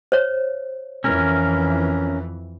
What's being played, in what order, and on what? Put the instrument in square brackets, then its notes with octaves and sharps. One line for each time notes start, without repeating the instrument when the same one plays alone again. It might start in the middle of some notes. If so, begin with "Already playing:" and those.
[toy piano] C5 C#5
[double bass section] F2 E3 [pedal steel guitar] C#4 A#4